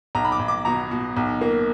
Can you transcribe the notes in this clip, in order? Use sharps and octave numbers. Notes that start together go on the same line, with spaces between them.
B1 A#5
B5
D6
B1
D6
B2 A#5
B2
B1
A#3